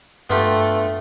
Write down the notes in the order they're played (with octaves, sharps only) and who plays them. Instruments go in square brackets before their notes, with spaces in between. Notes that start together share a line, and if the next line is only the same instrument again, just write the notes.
[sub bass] G2 [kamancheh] A3 [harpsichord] B3 F4 G4